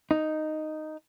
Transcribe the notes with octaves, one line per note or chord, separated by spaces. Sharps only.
D#4